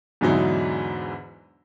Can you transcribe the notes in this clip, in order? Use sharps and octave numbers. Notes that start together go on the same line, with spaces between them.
E2 G#2 D3 F#3 D#4 E4